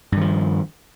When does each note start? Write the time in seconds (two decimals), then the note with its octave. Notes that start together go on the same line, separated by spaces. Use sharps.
0.12 G2
0.17 D#3
0.21 F3